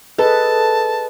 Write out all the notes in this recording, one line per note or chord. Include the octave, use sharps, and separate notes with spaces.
G#4 A4 B4 D#5 A5